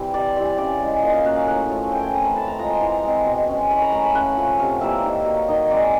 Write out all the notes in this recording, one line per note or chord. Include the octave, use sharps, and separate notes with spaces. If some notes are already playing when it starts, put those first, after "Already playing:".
Already playing: E3 G3 C4
C3 D5
E3 G3 C4 D5
C#3 D5
E3 G#3
A#2 D#5
F5
F#3 A#3 C#4 F#5
F5
A2 F#5
F3 A3 C#4
E3 G5
G#5
A3 C4 A#5
B5
A2 A5
A#5
F3 G#3 A#5
C6
E3
G#3 C4
B2
G#3 C#4
E3 B5
A#5
A3 C#4 B5
B5
C#3 F#5
F3 A3 C#4
C3 F5
E3 G3 A#3 E5
D#3
F#3 A#3
D#3 D#5
G#3 C4 D5